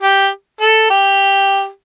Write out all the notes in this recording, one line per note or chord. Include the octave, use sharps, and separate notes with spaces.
G4
A4
G4